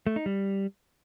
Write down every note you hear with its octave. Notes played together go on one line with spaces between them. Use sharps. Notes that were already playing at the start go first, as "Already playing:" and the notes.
A3
D#4
G3